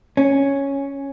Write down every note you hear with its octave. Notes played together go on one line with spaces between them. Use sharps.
C#4